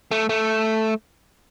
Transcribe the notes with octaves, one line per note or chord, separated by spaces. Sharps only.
A3
A3